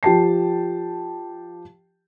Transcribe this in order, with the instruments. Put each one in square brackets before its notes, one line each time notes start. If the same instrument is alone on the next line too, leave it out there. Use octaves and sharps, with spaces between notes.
[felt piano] F3 G4 G5 A5 C7